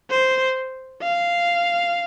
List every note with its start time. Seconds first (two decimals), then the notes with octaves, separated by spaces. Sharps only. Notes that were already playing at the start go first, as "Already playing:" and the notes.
0.10 C5
1.02 F5